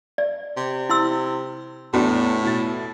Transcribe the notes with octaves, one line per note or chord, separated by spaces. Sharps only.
D5
C3
E4 C6 E6
E2 A2 B3 D4 F#4
B2 E4 A6